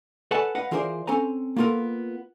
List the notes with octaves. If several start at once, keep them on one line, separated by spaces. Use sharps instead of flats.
A4 B4 D5 F#5 G#5 A5
B4 D#5 F5 F#5
E3 F4 G#4 A#4 C5 D5
C4 C#4 A4 C5 G#5 A#5
A#3 B3 F4 A4 A#4